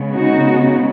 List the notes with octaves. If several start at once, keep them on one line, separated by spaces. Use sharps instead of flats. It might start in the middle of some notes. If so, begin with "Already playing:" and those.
Already playing: C#3 G#3 B3
D#4 F#4